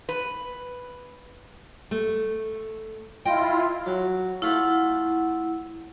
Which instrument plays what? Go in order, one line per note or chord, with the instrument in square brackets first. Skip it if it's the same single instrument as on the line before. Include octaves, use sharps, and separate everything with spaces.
[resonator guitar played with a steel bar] B4
[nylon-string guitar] A3
[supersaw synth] E4 F4 [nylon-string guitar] D#5 G5
[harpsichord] F#3
[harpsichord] A3 F4 [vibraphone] E4 F#5